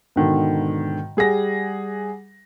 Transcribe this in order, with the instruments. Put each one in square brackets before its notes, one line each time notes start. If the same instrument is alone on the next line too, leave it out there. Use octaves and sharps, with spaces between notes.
[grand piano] G#2 B2 D3 D#3
G3 G#4 F#5 A#6